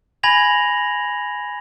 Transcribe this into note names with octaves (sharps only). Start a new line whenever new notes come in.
G#5 B5 G#6 A#6 F7 F#7